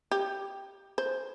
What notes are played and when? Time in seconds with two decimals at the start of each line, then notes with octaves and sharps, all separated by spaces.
0.11 G4
0.98 C5